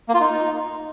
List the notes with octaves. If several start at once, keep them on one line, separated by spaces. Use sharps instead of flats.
A#3
F4
D#4